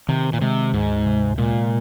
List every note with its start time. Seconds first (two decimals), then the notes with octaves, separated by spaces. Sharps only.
0.09 C3 D#3
0.33 A#2
0.41 C3 G#3
0.73 D2 G#2
1.06 C3
1.38 A#2 G#3